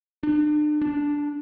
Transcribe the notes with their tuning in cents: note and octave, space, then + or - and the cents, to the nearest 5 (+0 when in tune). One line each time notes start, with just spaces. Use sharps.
D4 +40
D4 -10